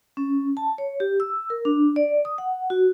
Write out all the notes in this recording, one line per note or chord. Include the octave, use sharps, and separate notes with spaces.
C#4
A5
C#5
G4
E6
A#4
D4
D5
D#6
F#5
F#4